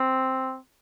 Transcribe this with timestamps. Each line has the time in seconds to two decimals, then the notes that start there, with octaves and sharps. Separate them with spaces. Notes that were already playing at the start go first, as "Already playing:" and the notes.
Already playing: C4